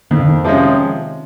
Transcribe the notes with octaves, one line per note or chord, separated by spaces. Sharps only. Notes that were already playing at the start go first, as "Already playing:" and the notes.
F2 D#3
D3
D#3
C3 F3 G#3 C#4